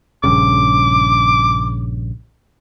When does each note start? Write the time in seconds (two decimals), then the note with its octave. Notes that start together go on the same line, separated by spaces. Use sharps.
0.24 A#1 G2 C#3 D6